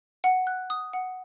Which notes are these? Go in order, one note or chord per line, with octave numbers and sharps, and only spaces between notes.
F#5
F#6
D#6
F#5